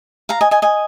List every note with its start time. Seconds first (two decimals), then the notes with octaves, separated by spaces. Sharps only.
0.29 F5 A#5
0.41 D#5 G#5
0.51 D#5 G#5
0.62 D#5 G#5